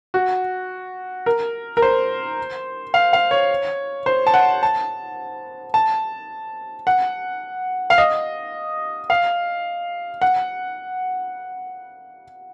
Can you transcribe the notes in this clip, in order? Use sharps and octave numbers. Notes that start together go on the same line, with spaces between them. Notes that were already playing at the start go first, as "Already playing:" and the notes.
F#4
A#4
A#4
C5
F5
F5
C#5
C5
A5
F#5
A5
A5
F#5
F5
D#5
F5
F#5